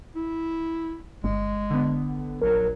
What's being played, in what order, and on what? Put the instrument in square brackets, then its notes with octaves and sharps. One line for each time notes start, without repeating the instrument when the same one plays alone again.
[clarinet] E4
[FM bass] G1 [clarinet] G#3
[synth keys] D3 B3
[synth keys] A#1 [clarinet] F#3 [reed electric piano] A#4